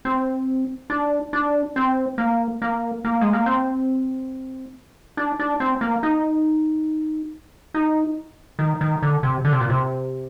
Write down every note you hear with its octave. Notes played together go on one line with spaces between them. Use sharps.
C4
D4
D4
C4
A#3
A#3
A#3
G#3
A#3
C4
D4
D4
C4
A#3
D#4
D#4
D#3
D#3
D3
C3
D3
C3
A#2
C3